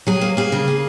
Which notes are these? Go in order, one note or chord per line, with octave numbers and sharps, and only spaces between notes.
F#3 G#4
A#3
A#3 G#4
C#3
A#3